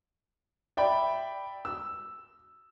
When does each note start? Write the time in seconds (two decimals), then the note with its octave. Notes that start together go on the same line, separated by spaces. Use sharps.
0.77 D5 E5 G5 B5
1.65 E6